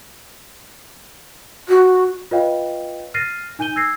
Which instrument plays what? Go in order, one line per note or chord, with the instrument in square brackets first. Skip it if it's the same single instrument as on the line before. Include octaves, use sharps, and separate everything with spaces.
[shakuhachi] F#4
[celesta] F4 B4 C#5 D#5 F5 G5
F6 A6 A#6 C7 D#7
D#4 G#5 G6 D#7 G7
E6 G#6 A#6 C7